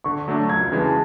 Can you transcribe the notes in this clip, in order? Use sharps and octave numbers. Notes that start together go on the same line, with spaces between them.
D3 C#6
F#3 A3 D4
C#2 G#6
C#3 E3 G#3
A5